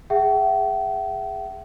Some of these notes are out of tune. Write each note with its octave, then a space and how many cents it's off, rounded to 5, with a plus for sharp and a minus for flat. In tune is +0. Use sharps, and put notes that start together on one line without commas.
G#4 -5 E5 +30 G5 -45